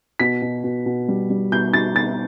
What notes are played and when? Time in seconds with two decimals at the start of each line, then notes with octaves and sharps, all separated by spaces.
0.19 B2 B6
0.42 B2
0.64 B2
0.86 B2
1.09 G3
1.30 G3
1.52 B2 G6
1.74 B2 A6
1.96 B2 A6